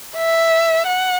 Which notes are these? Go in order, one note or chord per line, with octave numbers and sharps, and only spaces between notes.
E5
F#5